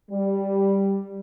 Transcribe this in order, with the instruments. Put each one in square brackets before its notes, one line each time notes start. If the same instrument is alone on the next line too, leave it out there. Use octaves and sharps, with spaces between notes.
[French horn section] G3